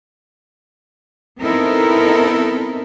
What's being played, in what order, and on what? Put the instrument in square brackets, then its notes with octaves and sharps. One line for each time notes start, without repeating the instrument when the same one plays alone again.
[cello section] B3 C4 D#4 E4 A4 A#4